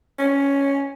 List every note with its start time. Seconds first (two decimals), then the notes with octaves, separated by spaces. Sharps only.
0.19 C#4